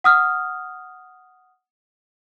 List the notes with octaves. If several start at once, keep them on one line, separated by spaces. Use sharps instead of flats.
F#5 D#6 F6